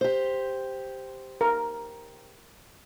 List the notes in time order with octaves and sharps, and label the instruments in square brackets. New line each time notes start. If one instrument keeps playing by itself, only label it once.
[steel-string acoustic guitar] G4 C5
[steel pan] A#4